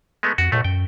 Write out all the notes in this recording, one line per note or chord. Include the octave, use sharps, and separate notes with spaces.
G#3 A3 B3
F2 F#4
C#2 A#2 A3
F#2 G5